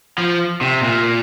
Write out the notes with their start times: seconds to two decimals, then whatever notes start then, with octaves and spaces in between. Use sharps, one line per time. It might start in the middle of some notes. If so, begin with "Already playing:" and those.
0.18 F3
0.61 C3
0.83 A#2